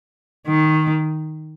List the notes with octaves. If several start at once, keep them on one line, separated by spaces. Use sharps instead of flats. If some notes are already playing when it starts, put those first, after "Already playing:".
D#3